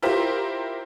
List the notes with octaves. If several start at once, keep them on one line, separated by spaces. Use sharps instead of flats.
E4 F4 G4 A#4 C5